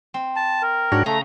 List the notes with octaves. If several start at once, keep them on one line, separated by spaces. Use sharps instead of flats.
C4
A5
A#4
G#2 D4 F#4 C#5
C#3 A3 A#5